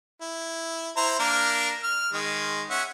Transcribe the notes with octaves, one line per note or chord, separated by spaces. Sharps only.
E4
E4 C5 A#5
A#3 D4 A#4
F6
D#3 G#3
C#4 E5 F#5